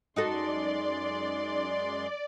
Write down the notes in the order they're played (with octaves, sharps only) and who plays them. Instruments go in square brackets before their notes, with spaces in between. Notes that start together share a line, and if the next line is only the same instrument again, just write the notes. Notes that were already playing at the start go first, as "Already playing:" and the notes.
[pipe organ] F#2 G#3 C6 [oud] D#4 F#4 A4 [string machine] D5